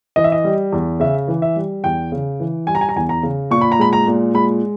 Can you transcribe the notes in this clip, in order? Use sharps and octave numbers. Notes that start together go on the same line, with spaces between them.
E3 D#5
E5
D#5
G3
E2
C#3 E5
E3
E5
G3
E2 G5
C#3
E3
G3 G#5
A#5
G#5
A#5
E2 G#5
A#5
C#3
A#2 C#6
B5
A#5
G#3 B5
A#5
A#2
G#3 B5